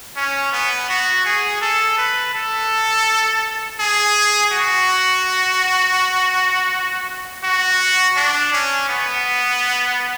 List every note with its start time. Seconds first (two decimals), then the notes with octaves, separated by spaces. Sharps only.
0.16 C#4
0.52 B3
0.89 F#4
1.26 G#4
1.61 A4
1.98 B4
2.34 A4
3.80 G#4
4.52 F#4
7.44 F#4
8.16 D4
8.53 C#4
8.89 B3